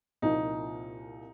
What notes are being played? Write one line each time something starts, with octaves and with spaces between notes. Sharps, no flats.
C2 A#2 F3 D#4